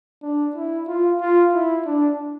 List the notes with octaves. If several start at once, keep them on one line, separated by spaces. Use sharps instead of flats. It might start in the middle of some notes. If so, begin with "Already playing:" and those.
D4
E4
F4
F4
E4
D4